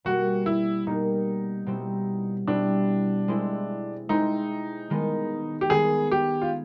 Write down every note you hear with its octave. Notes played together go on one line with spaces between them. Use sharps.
B2 G3 A#3 F#4
E4
B2 G3 A#3 D#4
B2 G3 C4 E4
B2 G3 C4 D4 E4
G#3 C4 E4
G#3 C4 D#4 E4
D#3 G#3 B3
G4
D#3 G#3 B3 G#4
G4
F4